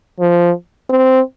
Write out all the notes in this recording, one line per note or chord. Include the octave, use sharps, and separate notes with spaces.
F3
C4